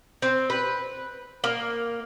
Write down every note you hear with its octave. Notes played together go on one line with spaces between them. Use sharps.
C4
B4
A#3